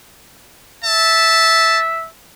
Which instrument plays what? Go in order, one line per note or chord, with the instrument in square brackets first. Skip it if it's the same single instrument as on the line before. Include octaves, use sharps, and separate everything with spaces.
[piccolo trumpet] E5 [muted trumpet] A5